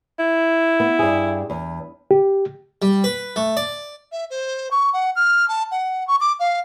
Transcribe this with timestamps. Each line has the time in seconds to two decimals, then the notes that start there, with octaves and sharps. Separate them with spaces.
0.19 E4
0.80 B3
0.99 G2 G#4
1.50 E2
2.11 G4
2.82 G3
3.04 B4
3.36 A3
3.57 D5
4.12 E5
4.30 C5
4.71 C#6
4.93 F#5
5.15 F6
5.48 A5
5.71 F#5
6.07 C#6
6.20 D6
6.39 F5